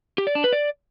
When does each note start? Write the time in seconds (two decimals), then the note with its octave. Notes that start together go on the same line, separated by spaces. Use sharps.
0.18 G4
0.27 D5
0.35 D4
0.44 B4
0.53 D5